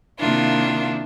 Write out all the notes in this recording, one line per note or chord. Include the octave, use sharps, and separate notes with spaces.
C3 D#3 A#3 D4 E4 F4